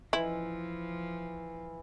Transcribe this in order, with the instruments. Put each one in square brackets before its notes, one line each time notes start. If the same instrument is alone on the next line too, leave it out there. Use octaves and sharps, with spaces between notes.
[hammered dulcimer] E3 [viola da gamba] F3 [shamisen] E4